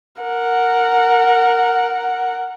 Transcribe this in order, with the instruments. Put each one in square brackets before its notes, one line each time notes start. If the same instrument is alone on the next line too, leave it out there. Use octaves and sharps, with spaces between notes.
[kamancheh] A#4 F#5